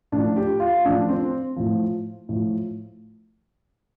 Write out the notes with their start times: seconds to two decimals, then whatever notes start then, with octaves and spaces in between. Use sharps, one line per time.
0.12 A2 F3 D4
0.36 G4
0.60 F4
0.84 A2 F3 D4
1.09 C4
1.56 A2 F3
2.29 A2 F3